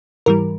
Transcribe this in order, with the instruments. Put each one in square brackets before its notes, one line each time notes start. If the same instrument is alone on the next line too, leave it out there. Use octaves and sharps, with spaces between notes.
[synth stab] G#2 E3 G3 A#4